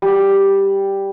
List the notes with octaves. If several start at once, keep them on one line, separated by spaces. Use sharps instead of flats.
G3